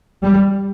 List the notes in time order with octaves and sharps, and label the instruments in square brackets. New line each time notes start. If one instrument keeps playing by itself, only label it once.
[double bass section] G3